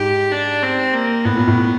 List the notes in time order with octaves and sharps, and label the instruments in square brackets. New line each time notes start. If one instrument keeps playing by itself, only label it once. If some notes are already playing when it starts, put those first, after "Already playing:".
Already playing: [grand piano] G#2 [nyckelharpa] G4
[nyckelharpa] D4
C4
A#3
[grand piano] A2 [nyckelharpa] B3
[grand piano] A#2
A2